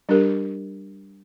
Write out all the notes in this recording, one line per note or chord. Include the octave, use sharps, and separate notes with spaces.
G3 D4 G4 A#4